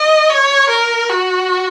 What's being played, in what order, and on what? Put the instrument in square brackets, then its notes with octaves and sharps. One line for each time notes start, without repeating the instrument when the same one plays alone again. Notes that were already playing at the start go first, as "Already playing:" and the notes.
Already playing: [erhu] D#5
C#5
A#4
F#4